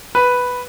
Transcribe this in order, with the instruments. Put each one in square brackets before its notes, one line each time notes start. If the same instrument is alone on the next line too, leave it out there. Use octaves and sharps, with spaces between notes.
[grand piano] B4